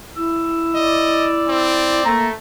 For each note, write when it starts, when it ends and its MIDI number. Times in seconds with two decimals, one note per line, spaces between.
0.17 2.05 64
0.17 1.72 88
0.75 2.04 74
0.75 1.30 75
1.49 2.14 60
2.06 2.33 57
2.06 2.28 58
2.06 2.28 82